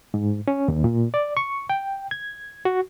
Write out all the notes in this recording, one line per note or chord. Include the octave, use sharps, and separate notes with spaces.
G#2
C#4
D#2
A#2
D5
C#6
G5
G#6
F#4